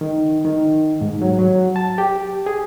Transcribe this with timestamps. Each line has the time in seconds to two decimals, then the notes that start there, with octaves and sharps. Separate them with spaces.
0.01 D#3
0.45 D#3
1.01 G#2
1.22 F#3
1.39 F#3
1.76 A5
1.98 G4
2.46 G#4